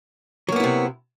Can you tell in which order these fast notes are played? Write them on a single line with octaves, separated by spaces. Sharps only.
F#3 A#3 B3 E4 C3